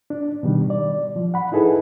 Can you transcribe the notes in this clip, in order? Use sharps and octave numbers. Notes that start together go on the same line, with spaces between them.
D4
B2 D#3 G3
D5
F3
F#5 B5
D#4 E4 G#4 A4 B4